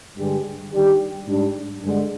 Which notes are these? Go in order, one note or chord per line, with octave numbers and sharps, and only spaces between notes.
G2 D3 G#3 D4 G4
D#3 G3 D4 G4
G#2 G3 D4
G2 D3 G#3